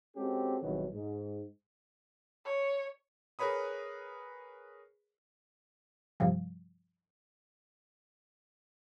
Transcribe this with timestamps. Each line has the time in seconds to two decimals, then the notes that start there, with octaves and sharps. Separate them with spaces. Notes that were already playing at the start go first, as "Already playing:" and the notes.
0.16 G#3 C4 C#4 F#4 G4 A4
0.62 G#1 B2 D#3 E3 F#3 G3
0.93 G#2
2.46 C#5
3.39 G#4 A#4 B4 C#5 B5 D#6
6.20 G2 C3 F3 G3